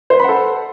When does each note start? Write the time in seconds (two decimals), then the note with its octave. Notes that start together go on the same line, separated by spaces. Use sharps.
0.10 C5
0.15 B4
0.19 B5
0.24 F#5
0.29 A4